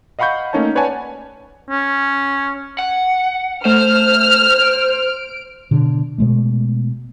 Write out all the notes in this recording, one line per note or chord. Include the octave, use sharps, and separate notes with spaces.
D#5 F5 F#5 B5 C#6 G6
A3 A#3 C#4 D#4 C#5 A5
B4 C#5 D5 F#5 G#5 A5
C#4
F#5
A3 C5 F6
D7
B2 D3
B2 G#3 A3